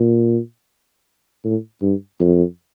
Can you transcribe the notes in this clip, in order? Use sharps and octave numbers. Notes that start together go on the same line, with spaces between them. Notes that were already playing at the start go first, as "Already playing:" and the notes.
Already playing: A#2
A2
G2
F2